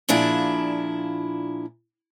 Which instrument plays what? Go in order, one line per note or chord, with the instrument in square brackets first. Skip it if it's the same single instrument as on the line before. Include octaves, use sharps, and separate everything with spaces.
[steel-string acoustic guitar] A#2 F3 D4 E4 G#4